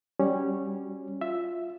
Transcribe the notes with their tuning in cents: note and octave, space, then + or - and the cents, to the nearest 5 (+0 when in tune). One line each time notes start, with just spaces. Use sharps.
G3 +0 C#4 -10 F#4 +0
F4 +0 E5 +0